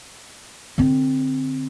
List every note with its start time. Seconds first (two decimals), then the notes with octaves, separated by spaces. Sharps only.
0.78 D3 C4